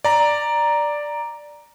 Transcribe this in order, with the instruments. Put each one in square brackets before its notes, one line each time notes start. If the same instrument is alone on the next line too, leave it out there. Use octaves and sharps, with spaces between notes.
[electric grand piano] D5 A#5